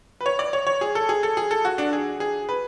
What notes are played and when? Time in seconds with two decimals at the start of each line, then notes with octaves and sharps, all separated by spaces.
0.21 B4
0.26 C#5
0.39 D5
0.53 C#5
0.67 C#5
0.81 G#4
0.95 A4
1.09 G#4
1.23 A4
1.37 G#4
1.51 A4
1.65 F#4
1.78 D4
1.93 G#4
2.20 G#4
2.49 B4